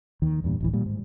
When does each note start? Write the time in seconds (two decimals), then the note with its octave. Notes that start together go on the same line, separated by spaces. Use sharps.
0.22 D#2 D#3
0.44 E2 G2 A#2
0.60 D1 A1 E3
0.73 A#2 G3
0.86 G#2